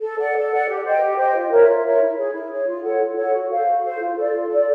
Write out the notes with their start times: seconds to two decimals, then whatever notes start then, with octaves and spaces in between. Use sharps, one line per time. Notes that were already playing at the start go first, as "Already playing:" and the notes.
0.01 A4
0.18 D5 F#5
0.35 A4
0.51 D5 F#5
0.68 G4
0.84 C5 D#5 G5
1.01 G4
1.17 C5 D#5 G5
1.34 F4
1.50 A#4 C#5 E5
1.68 F4
1.83 A#4 C#5 E5
2.00 E4
2.16 G#4 C#5
2.33 E4
2.50 G#4 C#5
2.67 F4
2.83 A4 C#5 F#5
3.00 F4
3.16 A4 C#5 F#5
3.33 F#4
3.49 A4 C5 F5
3.66 F#4
3.83 A4 C5 F5
3.99 F4
4.15 A4 D5
4.32 F4
4.49 A4 D5